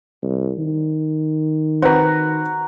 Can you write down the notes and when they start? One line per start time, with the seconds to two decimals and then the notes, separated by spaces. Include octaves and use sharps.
0.23 C2
0.58 D#3
1.82 C4 F#4 B4 A#5